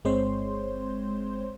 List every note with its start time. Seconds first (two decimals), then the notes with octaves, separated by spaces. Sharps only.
0.05 G1 G#3 C4 C5 C#5 C6